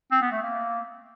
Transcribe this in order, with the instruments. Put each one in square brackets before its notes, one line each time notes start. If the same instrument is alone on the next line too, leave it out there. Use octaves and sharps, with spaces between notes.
[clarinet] C4
B3
A3
A#3